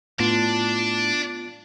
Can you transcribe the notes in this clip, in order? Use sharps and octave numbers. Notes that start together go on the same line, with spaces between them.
A2 B3 D4 F4